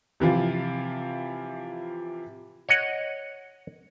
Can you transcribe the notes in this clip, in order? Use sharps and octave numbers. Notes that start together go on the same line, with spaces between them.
C3 E3 F3 F4
C#5 D#5 F#5